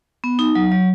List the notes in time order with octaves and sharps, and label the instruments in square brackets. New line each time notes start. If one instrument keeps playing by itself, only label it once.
[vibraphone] B3
D#4
F#3
F#3